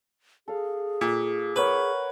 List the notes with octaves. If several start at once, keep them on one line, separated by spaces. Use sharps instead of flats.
G#4 A4 F5
A#2
A#4 B4 C#5 F#5